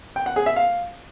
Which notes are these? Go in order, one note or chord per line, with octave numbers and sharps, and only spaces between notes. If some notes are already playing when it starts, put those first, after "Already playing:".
G5
F#5
G#4
E5
F5